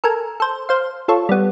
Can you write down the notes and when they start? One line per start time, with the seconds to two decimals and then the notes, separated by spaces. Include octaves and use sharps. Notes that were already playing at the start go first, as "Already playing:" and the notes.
0.04 A4 A#4 G#5
0.40 A4 C5
0.69 C5 F5
1.08 F4 A4 C#5
1.29 G3 B3